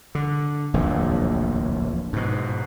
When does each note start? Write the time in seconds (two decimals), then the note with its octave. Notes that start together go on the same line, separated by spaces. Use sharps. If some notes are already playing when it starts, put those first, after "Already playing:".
0.15 D3
0.73 D1 A#1 E2 A2
2.13 G#2 B2